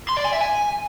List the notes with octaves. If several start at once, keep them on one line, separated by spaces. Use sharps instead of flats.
C6
D5
G#5
E5
G#5